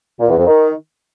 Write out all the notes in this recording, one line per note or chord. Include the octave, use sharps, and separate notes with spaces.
A#2
E2
F2
D#3